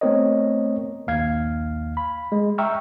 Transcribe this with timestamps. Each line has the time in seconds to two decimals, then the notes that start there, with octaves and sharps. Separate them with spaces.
0.01 A3 B3 C4 A#4 C#5 D#5
1.07 A#1 D#2 F5 G#6
1.97 B5
2.32 G#3
2.58 E5 G5 A#5 C#6 E6 F6